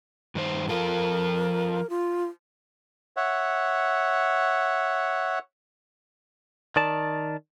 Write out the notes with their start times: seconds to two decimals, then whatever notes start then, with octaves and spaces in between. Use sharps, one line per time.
0.35 G2 D#3 C5
0.69 F3 F4 A4 A#4
1.90 F4
3.17 C#5 E5 F#5
6.76 D#3 D5 A5